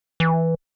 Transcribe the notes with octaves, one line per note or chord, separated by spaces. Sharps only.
E3